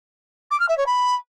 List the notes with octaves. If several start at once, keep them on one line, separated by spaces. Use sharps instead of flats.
D6
F6
E5
C#5
B5